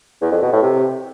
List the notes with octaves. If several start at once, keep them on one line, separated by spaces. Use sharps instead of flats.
E2
F2
B2
A2
C3